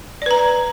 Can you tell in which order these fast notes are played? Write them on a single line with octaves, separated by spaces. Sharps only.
D5 B4 A#5